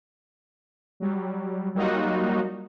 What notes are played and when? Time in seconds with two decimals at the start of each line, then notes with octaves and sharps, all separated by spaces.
1.00 F#3 G3
1.75 F#3 G3 A#3 D#4 F4 F#4